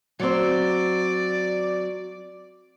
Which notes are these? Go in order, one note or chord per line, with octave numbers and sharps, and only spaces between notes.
F#3 C4 D5